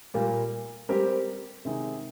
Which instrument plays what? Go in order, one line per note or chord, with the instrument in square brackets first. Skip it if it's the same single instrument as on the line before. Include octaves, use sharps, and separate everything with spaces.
[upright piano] A#2 G3 A#3 F4
G3 C4 G4 A#4
C3 D#3 G#3 D#4